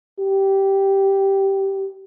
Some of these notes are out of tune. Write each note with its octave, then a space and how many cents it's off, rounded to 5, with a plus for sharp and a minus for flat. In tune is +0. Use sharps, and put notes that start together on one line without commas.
G4 -10